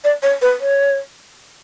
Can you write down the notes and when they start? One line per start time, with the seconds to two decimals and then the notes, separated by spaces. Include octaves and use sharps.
0.04 D5
0.23 C#5
0.42 B4
0.61 C#5